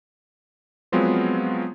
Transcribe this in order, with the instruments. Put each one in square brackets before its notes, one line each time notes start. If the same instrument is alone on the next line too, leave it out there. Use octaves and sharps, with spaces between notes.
[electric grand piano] F3 F#3 G#3 B3 C4 F4